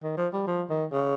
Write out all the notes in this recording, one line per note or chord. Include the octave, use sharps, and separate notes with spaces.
D#3
F3
G3
F3
D#3
C#3